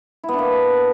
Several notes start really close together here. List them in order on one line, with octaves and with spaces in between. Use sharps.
E4 B3 D4 A#3